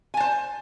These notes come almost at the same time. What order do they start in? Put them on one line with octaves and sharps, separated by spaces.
G#5 A5 C5